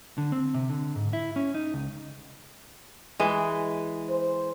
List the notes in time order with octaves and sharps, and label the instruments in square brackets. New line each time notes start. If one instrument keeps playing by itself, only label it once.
[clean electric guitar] D3
C4
C3
D3
G#2
E4
C#4
D#4
C#2
[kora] E3 G#3
[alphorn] C5